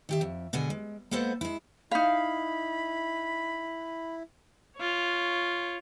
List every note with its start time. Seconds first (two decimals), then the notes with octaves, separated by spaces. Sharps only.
0.09 D#3 G4 E5
0.21 F2
0.53 B2 D3 G#3 F#5 G#5
0.70 G#3
1.11 G#3 A#3 B3 A4 C5 F#5
1.41 G#3 E4
1.91 D#4 E4 F5 B5
4.76 F4 C#5